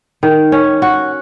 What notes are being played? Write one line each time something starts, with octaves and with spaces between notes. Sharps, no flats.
D#3
C#4
F#4